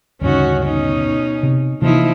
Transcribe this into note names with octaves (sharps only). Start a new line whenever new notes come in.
D2 G2 C#3 C#4 D#4 F#4
B2 C#4 D#4
C3
C3 E3 F3 A#3 D#4 E4